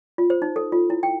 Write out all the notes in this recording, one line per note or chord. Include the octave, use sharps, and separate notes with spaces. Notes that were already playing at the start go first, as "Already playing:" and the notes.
F4
C5
D#4
A4
F4
E4
G5